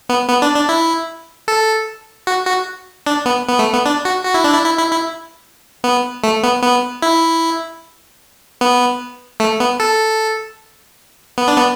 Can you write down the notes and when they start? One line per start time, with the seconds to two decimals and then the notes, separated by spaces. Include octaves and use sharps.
0.09 B3
0.29 B3
0.42 D4
0.55 D4
0.69 E4
1.48 A4
2.27 F#4
2.47 F#4
3.06 D4
3.26 B3
3.49 B3
3.59 A3
3.73 B3
3.86 D4
4.05 F#4
4.25 F#4
4.34 E4
4.44 D4
4.54 E4
4.65 E4
4.78 E4
4.91 E4
5.84 B3
6.24 A3
6.43 B3
6.63 B3
7.02 E4
8.61 B3
9.40 A3
9.60 B3
9.80 A4
11.38 B3
11.48 D4
11.57 B3